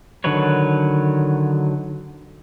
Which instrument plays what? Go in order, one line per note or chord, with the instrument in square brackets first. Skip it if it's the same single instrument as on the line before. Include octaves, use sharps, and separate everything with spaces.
[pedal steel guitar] D3 D#3 F#3 B4 C#5